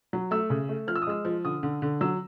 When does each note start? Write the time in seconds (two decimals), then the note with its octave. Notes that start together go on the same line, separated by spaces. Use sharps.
0.13 F#3
0.31 A3 E6
0.50 C#3
0.69 A3
0.87 F3 F6
0.96 E6
1.02 D#6
1.07 G#3 E6
1.25 F3
1.45 D3 D#6
1.63 D3
1.82 D3
2.01 F#3 E6